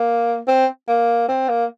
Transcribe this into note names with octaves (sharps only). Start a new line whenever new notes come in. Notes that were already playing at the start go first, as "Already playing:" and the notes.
Already playing: A#3
C4
A#3
C4
A#3